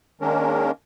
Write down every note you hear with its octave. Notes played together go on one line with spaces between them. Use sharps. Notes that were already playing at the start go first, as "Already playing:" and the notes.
D#3 G#3 A#3 C#4 D4 A#4